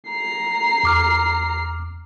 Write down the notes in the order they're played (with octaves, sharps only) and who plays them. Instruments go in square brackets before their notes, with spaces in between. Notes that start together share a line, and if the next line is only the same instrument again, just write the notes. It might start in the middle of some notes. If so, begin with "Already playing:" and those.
[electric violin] A#5 C7
[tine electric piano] E2 D6 F6